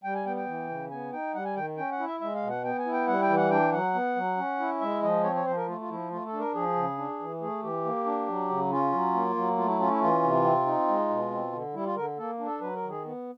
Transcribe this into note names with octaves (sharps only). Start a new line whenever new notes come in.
G3 G5
G#5
B3 G5
G5
E3
C#3
B3 G#5
D#4 G5
G3 F#5
G#5
D#3 G5
C#4 G5
F#5
E4
E5
G#3 E5
F5
B2
F#5
B3 G5
G#5
E4
G5
G3 F#5
G5
E3
F#5
D4 G5
F#3 F#5
B3
F#3
C#4
E4
G#3 E5
F3 D#5
C4 C#5
C#5
F3 C5
A#4
A3 F4
F4
F3 E4
A3 F4
A4
D4
A#4
F3 G#4
C#3
D4
E3
A3 G#4
E3 G4
A#3
D4
F#3
C#3
C#4 F4
F#3
A#3
F#3
A3 F4
E4
C#4 F4
E4
E3 F4
C3
C4
D#4
G#3
B2
C4
D3
G3 E4
F4
D3 A#4
A#3 A4
D4
A4
F#3 B4
A#4
D#3
G#4
B3